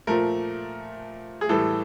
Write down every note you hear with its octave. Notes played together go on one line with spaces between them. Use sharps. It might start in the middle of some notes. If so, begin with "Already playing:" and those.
A#2 F3 A3 A#4
G#4
A2 E3 G3 A4